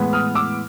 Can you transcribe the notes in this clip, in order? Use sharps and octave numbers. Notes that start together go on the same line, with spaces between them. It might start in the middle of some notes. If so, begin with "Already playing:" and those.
Already playing: A2 E3 G#3 B3
D#6 F6
D6 E6